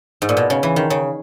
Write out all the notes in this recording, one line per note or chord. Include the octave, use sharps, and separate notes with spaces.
G#2
A#2
B2
C#3
E3
D#3
C#3